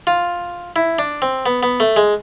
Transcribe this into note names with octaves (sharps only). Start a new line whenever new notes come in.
F4
E4
D4
C4
B3
B3
A3
G#3